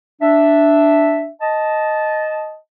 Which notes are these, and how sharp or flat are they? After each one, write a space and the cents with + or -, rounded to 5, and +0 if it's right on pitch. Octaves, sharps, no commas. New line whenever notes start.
D4 +0 E5 +0
D#5 +0 A5 -15